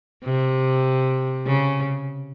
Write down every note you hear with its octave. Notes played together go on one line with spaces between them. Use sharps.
C3
C#3